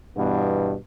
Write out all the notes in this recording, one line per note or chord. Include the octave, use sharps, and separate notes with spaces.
G2 B2 E3 B3